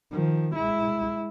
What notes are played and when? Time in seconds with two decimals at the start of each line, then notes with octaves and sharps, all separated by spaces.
0.12 D#3 F3
0.56 G#3 E4